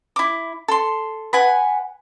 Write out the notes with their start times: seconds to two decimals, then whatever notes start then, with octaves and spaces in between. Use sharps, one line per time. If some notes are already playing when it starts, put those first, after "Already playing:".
0.16 E4 D6
0.68 A4 C6
1.33 B4 F#5 G#5